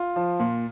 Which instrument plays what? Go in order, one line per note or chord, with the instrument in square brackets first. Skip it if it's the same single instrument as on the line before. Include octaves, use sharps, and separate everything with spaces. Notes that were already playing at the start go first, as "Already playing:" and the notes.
Already playing: [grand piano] F4
F3
A#2